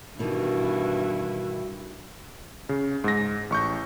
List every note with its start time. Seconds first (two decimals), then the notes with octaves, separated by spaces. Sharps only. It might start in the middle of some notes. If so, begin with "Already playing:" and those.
0.19 G2 B2 D#3 E3 E4 F#4
2.69 C#3
3.04 G#2 A#6
3.50 A1 C#6 G6